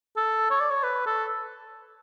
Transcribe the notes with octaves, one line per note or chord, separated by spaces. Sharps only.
A4
C#5
D5
C#5
B4
A4